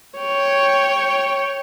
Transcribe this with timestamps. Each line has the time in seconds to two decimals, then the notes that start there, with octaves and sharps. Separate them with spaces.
0.18 C#5 G5